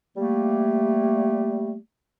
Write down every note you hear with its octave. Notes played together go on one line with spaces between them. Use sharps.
G3 A3 A#3